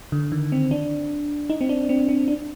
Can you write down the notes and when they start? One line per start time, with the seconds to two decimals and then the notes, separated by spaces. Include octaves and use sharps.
0.12 D3
0.32 D#3
0.52 C4
0.71 D4
1.50 D#4
1.61 C4
1.69 D4
1.89 C4
2.09 C4
2.28 D4